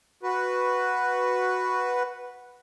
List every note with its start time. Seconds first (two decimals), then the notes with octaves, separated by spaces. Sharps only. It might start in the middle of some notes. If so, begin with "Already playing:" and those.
0.23 F#4 B4